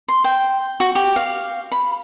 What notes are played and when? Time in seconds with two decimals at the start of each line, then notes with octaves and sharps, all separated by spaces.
0.08 C6
0.24 G5
0.80 F#4
0.95 G4
1.16 F5
1.72 B5